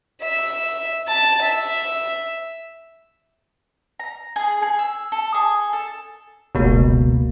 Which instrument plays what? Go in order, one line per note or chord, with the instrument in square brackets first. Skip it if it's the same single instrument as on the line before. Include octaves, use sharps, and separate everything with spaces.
[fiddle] E5
A5
E5
[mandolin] A#5
G#4
G#4
E6
A4
G#4
A4
[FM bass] F1 [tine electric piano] C#2 B2 A#3